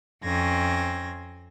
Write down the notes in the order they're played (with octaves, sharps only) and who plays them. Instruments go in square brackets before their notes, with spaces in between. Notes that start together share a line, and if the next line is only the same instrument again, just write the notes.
[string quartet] F2 C4 C#4 G#6 A#6